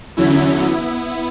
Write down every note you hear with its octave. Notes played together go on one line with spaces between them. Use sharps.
E2 D3 F#3 C#4 E4
B3 E4